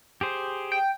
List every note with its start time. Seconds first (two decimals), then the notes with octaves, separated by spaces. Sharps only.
0.21 G4 G#4 C5
0.72 G5